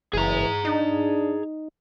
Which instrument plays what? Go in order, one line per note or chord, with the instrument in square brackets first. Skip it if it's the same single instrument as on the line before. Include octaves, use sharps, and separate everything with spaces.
[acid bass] F#1 [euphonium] E3 [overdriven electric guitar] G#4 A#5
[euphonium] D4 [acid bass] D#4